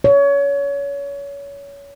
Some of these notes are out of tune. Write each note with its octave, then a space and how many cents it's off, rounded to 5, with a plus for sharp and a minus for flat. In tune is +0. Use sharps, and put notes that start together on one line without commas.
C#5 +25